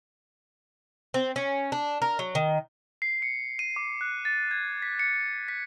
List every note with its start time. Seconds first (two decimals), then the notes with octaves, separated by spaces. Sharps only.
1.14 C4
1.36 C#4
1.72 D4
2.02 A#4
2.19 F#3
2.35 D#3
3.02 C7
3.22 C#7
3.59 D#7
3.76 D6
4.01 F#6
4.25 A6
4.51 G#6
4.82 B6
4.99 C#7
5.48 B6